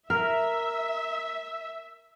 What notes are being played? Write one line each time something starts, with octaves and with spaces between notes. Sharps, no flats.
A#4 E5